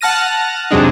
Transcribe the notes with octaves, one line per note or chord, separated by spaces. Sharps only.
F#5 A5 F6 A#6 D#7
F2 C3 F#3 G#3 D4 D#4